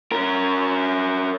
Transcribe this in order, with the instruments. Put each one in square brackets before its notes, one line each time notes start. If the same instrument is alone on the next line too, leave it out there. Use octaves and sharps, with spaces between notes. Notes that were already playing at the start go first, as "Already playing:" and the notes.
[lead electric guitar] C#4 A#4